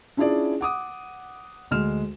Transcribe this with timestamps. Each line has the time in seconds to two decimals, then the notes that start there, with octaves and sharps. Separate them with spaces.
0.17 C#4 D4 E4 F4 G#4 D5
0.61 F#5 D6 D#6
1.71 D2 G#3 F6 E7